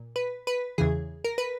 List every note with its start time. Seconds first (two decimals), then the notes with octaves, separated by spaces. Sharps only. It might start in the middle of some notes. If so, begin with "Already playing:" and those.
Already playing: A#2
0.16 B4
0.47 B4
0.78 E2 C#3 E3 G#4
1.24 A#4
1.38 B4